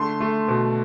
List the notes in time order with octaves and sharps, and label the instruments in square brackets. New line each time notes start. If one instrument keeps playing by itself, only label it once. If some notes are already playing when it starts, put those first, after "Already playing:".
Already playing: [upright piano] D3 A3 C6
A3
B2